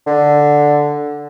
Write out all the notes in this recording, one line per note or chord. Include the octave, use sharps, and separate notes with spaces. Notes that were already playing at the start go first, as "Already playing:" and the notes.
D3